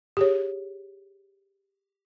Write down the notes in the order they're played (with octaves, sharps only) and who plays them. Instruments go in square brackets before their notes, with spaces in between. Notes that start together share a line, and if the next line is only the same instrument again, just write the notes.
[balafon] G4 G#4 C#5